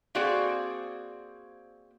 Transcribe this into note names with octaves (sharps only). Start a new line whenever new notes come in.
A#3 C4 F#4 G#4 D5